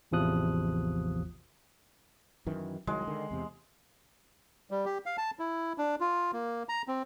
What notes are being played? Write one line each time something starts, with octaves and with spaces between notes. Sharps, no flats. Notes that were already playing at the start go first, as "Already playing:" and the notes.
A1 E2 C3 F3 D#6 F#6
F#2 D#3 E3
C2 D#3 F#3 G#3
D3 D#3
E2 C3
G3
G4
F5
A5
E4
D4
F4
A#3
A#5
C4